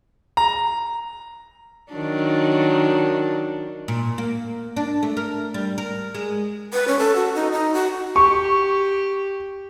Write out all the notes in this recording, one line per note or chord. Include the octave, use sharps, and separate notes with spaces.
A#5
D#3 F#3 D4
A#2
A#3
D4
A3
A#4
G3
A#4
G#3
B4
C#4
A4
F#4
D#4
D#4
F#4
G4 C#6